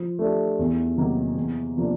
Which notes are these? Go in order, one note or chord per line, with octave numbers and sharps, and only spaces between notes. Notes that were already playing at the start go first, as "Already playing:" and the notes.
Already playing: F3
A3 D4 G4
E2
C3 D#3 F#3 A#3
E2
C3 F3 A#3 D4